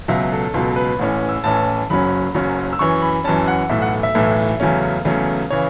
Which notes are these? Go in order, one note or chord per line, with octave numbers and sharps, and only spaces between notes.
C#2 B2 F#3 E5
A4
C#2 B2 F#3 A4
B4
A1 A2 E3 C#4
E6
A1 A2 E3 C#4 A5
F#1 F#2 F#3 C#4 B5
F#1 F#2 F#3 C#4
E6
F#2 E3 C#4 C#6
B5
F#2 E3 C#4 A5
F#5
B1 A2 E3 A3 E5
F#5
E5
B1 A2 E3 A3
E2 C#3 F#3 A3 C#4
E2 C#3 F#3 A3 C#4
C#3 E3 C#5